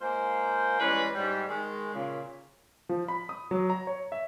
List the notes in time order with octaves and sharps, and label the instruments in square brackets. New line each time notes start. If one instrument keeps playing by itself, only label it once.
[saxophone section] G#3 A#3 F4 C5
E3 G3 G#3 C#4 B4
G#2 G3
D#3 G#3
A#2 C#3
[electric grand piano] F3
B5
D#6
F#3
A#5
C#5
E5